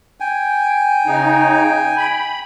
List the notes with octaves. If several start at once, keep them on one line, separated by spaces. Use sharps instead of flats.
G5 G#5
C#3 D#4
B5